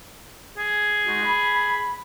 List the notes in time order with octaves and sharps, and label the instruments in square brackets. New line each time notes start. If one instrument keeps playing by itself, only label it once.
[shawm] G#4
[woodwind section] G#3 D#4 F#4
B5